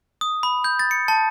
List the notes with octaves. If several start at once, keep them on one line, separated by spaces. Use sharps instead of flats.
D#6
B5
G6
A6
C#7
A5